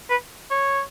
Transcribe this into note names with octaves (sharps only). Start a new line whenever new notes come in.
B4
C#5